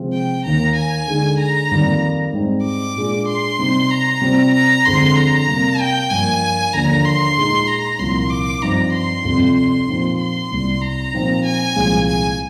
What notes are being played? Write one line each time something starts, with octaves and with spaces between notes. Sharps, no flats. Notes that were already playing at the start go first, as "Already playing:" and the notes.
Already playing: C3 F3 G#3 C4 F4
G5
D#2 D#3 A#3 A#5
G#5
D3 G#3 D#4
A#5
F2 D#3 G3 A#3
G#2 G3 C4 D#4
D6
A#2 G#3 D4 F4
C6
C3 G3 C4 D#4
A#5
C3 G3 C4 F4
A#5
F2 D3 G#3 C4 C6
A#5
C3 G3 A#3
G5
G2 F3 A#3 G#5
D#2 D3 F3 A#3 D4 A#5
C6
A#2 G#3 D#4
A#5
C2 A#2 F3 A#3 C6
D6
G2 F3 C4 D#4 A#5
C6
F2 C3 G3
C6
A#2 F3 C4 D#4
C6
C2 C3 G3
A#5
A#2 F3 C4 D#4
G#5
C2 A#2 F3 G#3
G#5